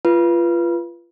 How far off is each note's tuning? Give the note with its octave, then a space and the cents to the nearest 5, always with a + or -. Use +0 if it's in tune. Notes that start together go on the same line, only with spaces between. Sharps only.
F4 -25 B4 -10